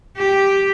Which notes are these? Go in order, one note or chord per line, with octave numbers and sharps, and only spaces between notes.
G4